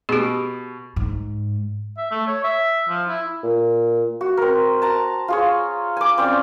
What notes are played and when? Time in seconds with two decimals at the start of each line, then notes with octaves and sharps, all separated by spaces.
0.09 B2 G4 G#4
0.96 G#2
1.98 E5
2.11 A3
2.27 C#5
2.44 E5
2.89 F3
3.08 E4
3.43 A#2
4.21 F#4
4.37 C4 A#4
4.82 A5 A#5
5.28 F4 G#4 C#5
5.97 G#5 D6
6.18 C4 C#4 D5